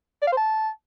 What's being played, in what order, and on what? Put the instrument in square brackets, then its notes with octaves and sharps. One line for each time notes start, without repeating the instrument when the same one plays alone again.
[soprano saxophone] D5
F5
C5
A5